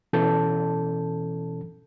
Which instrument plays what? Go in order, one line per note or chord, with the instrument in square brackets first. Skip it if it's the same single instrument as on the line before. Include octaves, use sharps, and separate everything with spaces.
[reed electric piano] B2 E3 C#4 A4 A5 G6